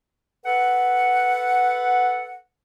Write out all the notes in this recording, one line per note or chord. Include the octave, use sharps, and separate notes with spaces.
A4 B4 F#5